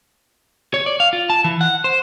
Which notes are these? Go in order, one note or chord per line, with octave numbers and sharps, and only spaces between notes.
C#5
D5
F5
F4
A5
E3
F#5
C5